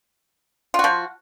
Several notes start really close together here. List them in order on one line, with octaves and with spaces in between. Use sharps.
F4 F#4 F3